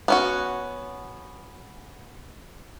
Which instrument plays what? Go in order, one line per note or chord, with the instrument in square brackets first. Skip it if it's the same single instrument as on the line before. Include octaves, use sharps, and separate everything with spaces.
[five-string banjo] B3 C#4 F#4